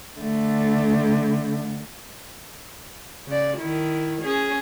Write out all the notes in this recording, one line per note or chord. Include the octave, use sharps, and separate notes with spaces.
D3 A3
C#3 D5
D#3 E4
C#4 G#4